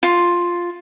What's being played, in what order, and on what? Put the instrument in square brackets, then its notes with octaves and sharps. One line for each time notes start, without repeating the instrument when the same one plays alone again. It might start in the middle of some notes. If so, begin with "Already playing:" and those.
[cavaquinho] F4